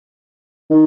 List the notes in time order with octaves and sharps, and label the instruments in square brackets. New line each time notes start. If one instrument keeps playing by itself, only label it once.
[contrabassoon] D#3